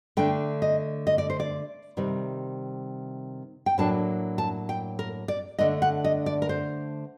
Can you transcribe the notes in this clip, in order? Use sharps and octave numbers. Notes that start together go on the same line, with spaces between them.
D3 A3 D4 G5
D#5
D#5
D5
C5
D5
C3 D#3 G3
G5
A2 F#3 A#3 D4 A5
A5
G5
A#4
D5
D3 A3 D4 D#5
F#5
D#5
D5
A#4
C5